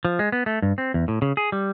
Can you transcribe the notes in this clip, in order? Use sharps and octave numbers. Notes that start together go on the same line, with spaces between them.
F3
G#3
B3
A3
G2
C4
E2
A2
C#3
G#4
G3